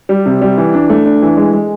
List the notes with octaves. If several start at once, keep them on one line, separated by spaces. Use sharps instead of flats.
G3
C3
G3
E3
D4
A3
D4
E3
G#3
G#3